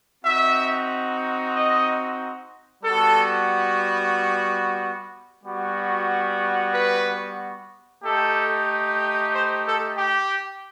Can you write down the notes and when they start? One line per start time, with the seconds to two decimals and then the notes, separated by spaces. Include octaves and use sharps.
0.25 C4 D#4 F#4 E5
1.54 D#5
2.84 G3 B3 F#4 A4
5.44 G3 B3 F#4
6.74 B4
8.03 A3 D#4 G4 A4
9.33 C5
9.66 A4
9.98 G4